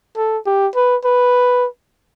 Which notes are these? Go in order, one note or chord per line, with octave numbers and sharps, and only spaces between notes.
A4
G4
B4
B4